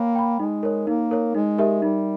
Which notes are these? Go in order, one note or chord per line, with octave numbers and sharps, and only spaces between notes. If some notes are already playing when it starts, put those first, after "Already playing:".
Already playing: A#3 C#5 G5 B5
G5 B5
G#3 D#4
A#4 C#5
A#3 D#4
A#4 C#5
G#3 D#4
G4 A#4 E5
G3 D#4